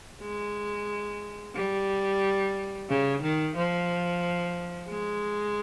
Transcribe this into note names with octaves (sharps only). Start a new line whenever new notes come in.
G#3
G3
C#3
D#3
F3
G#3